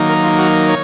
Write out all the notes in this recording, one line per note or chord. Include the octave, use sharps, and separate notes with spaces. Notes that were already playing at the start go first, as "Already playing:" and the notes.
Already playing: D#3 F#3 A#3 D#4
A#4
F4
F#4
C#5